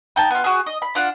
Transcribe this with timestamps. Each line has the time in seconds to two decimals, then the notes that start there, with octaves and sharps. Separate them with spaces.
0.16 D#4 G5 A5
0.30 B3 F4
0.44 F#4 G#4
0.66 D#5
0.82 B5
0.95 D4 F4 F#5